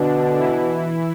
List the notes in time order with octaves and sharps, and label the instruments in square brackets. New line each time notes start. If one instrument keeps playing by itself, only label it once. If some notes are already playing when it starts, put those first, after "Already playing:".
Already playing: [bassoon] B2 [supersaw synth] D3 D4
[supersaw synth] E3 E4